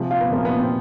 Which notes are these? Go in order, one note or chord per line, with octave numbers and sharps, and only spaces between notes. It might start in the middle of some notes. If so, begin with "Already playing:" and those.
Already playing: C3 F3 G#3
F4
B3
C3 F3 G#3 A#3
B3
C4